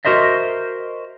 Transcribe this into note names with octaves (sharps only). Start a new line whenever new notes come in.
F#4 A#4 C5 D#5 E5